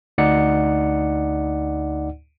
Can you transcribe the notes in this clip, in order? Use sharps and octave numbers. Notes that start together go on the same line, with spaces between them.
D2 D#4 D5 F#5 C#7